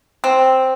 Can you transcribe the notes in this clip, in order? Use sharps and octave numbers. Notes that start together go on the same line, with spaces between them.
C4